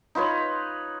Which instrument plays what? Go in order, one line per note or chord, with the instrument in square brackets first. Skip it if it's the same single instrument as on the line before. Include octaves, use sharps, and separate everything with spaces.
[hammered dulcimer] D#4 F4 B4 C#5